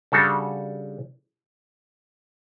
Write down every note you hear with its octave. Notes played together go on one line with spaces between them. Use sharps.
C#3 G3 D4 F#4 A4